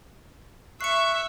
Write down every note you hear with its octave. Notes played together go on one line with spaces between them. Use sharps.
E5 C#6 F#6 C7 C#7